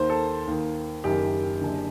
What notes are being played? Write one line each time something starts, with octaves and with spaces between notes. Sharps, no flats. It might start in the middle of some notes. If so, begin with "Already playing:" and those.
Already playing: D#2 D#3 C5
A4
D#2 D#3
F#1 F#2 D#3 G4
F#1 F#2 D3